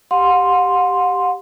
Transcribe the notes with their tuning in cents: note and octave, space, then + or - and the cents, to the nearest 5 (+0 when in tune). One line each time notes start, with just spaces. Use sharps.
G4 +0 F#5 -40 C6 +0